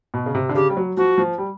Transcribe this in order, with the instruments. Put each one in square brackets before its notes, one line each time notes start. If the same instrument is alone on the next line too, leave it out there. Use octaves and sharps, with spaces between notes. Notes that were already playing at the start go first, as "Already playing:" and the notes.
[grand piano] B2
C#3
C3
D3
[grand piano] C#3 [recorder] G4
[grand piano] G3
F#3
[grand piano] F3 [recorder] F#4
[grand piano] F3
G3